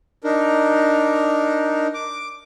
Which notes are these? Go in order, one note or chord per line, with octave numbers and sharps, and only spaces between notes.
D4 D#4 A#4
D6